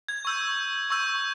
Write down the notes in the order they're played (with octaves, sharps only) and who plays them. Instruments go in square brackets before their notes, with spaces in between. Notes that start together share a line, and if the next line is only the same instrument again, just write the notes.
[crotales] G#6
C#6 E6 G6
C#6 E6 G6